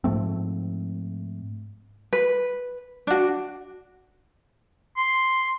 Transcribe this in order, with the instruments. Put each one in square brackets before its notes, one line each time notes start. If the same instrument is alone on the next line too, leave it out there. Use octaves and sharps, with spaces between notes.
[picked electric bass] G#2 F3 A3 C4
[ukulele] B4
D4 F#4
[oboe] C6